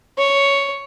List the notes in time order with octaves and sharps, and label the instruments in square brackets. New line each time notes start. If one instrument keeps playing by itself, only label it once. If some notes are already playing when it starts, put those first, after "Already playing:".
[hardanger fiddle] C#5